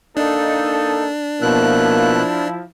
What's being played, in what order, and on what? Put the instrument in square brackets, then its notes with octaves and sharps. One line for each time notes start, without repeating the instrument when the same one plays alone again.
[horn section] A#3 D#4 A4 [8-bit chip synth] D4
[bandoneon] B2 F#6 [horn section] F3 E4 [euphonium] A#3